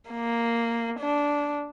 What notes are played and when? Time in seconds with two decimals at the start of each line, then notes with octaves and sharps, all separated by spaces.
0.10 A#3
1.00 D4